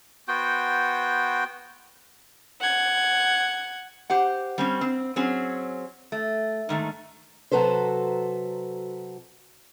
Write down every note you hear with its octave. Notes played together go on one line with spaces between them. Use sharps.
B3 F#4 C5 G5
F#5 G#6
G4 C5 F#5
G3 C4 C#4
C4
F#3 C4 C#4 G#4
A3
G#2 D#3 A3
C3 F#3 F#4 A4 B4 C5